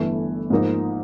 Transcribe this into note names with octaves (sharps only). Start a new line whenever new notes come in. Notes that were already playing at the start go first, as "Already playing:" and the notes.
Already playing: G1 G2 E3 A3
G#2 F3 A#3 D#4